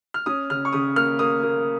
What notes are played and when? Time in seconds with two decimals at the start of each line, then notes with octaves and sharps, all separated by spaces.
0.14 F6
0.26 C#4 D#6
0.50 C#3 F6
0.65 C#6
0.73 C#3 D#6
0.96 A#3 F6
1.19 A#3 D#6
1.43 A#3